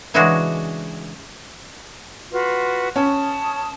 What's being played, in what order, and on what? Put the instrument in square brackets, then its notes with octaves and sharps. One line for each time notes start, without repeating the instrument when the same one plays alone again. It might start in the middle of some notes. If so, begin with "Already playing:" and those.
[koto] C#3 E3 G#3 C#4 D4 F#4
[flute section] F4 F#4 B4
[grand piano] C#4 [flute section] A5 D#6